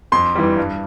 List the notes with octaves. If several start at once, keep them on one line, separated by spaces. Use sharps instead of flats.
F2 C6
E3 G3
G2